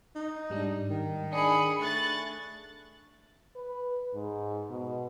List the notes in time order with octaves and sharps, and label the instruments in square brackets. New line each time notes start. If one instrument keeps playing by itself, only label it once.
[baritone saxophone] D#4
[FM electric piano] G#2 G3 D4
[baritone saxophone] D#3
[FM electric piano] D4 [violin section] G#4 B5 C#7
[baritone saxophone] A3 [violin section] C#6 F#6 A6
[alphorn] B4
G#2
B2